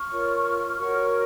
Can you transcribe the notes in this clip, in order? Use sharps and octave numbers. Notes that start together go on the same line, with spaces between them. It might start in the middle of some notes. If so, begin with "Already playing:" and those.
Already playing: C#6 F6
F4 A#4 C#5
F#4 A#4 C#5 C#6 F6